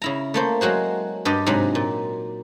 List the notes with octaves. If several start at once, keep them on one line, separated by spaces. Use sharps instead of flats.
C#3 E4 A#5
A3 A#3 C5
F#3 G#3 F#4 C5
G2 G4 D5 D#5
G#2 C3 F#3
A#2